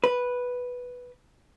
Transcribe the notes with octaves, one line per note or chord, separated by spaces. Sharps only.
B4